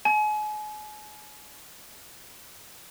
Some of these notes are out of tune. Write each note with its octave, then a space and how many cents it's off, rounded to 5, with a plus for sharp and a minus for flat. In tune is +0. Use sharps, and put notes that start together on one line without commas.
G#5 +35